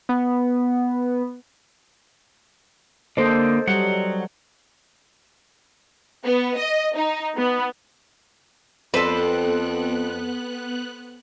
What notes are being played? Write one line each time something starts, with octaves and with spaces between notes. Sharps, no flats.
B3
D3 A#3 A4 C5 D#5
F#3 G3 F#5
B3
D#5
D#4
B3
F2 B3 C4 A4 B4 C5 F#6